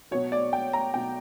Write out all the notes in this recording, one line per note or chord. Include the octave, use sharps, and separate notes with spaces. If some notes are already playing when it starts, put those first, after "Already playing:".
B2 F#3 C#5
D5
G5
A#5
B2 F#3 G5